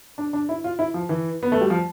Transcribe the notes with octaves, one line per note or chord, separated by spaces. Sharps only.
D4
D4
E4
F4
E4
F3
E3
B3
A3
G3
F3